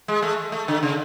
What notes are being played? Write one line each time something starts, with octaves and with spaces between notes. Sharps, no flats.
G#3
A3
A3
D3
C#3